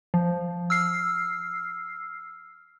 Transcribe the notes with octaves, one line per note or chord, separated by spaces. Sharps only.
F3
E6 F6 C7